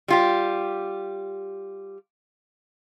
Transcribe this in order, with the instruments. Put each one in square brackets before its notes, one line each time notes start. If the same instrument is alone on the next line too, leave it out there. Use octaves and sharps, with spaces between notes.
[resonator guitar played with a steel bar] G3 F4 G4